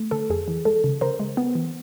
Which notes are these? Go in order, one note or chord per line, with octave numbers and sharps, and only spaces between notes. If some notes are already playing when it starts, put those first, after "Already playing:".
Already playing: A3
D3 A4
F2 G#4
E3
G#3 A4
C#3
C#3 A#4 C5
G#3
B3
E3